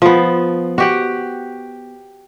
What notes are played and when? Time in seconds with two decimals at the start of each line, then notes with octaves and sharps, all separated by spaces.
0.02 F3 B3
0.78 F#4 G4 F#5